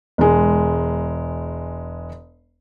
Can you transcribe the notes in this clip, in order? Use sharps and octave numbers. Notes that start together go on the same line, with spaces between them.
E1 G#3